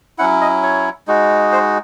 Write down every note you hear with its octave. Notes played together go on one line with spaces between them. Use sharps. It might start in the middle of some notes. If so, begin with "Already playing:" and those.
F#3 C#4 E4 F#5
D#5
C#5
G#3 D#4 F#4
C5